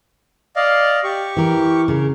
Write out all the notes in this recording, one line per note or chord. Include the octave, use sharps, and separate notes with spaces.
D5 D#5 F5
G4 C#6
E3 A#4
C#3 A#4